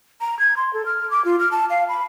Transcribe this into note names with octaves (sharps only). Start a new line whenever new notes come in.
A#5
G#6
C6
A4
F6
D6
F4
F6
A5
F5
B5